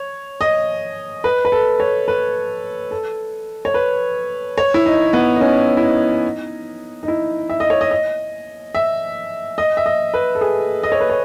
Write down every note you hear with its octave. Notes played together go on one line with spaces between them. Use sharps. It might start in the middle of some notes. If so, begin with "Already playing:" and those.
Already playing: C#5
D#5
B4
B4
A4
C#5
B4
A4
C#5
B4
C#5
E4
D#4
B3
D#4
C#4
E4
D#4
D#4
E4
E5
D#5
C#5
D#5
D#5
E5
D#5
E5
D#5
B4
A4
G#4
D#5
C#5
B4
C#5